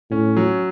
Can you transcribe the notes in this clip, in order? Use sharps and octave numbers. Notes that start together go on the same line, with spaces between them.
A2 C#4
F#3